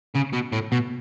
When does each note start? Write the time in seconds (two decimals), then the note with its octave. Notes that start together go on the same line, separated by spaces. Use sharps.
0.15 C#3
0.33 B2
0.53 A2
0.72 B2